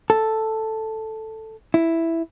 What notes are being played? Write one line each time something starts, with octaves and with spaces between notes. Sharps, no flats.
A4
E4